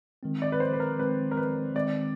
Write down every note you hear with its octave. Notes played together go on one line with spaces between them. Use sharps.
D#3 G#3 C4
D5
B4
C5
B4
A#4
D#3 G#3 C4 B4
A#4
B4
D#3 G#3 C4 D5